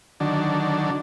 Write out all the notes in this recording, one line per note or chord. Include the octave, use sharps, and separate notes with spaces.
D3 D#3 F#3 D4